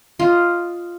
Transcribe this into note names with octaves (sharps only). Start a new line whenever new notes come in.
F4 D#5 F5